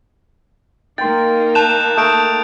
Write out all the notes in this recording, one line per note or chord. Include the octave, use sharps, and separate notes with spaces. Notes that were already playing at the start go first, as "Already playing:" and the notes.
A#3 D#4 A#4 G5 C6 A6
A5 F#6 G6 E7 F7
A3 D#6 G6 D7